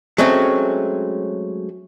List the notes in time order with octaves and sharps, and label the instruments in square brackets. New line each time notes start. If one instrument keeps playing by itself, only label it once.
[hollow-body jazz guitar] F#3 G#3 A3 C4 C#4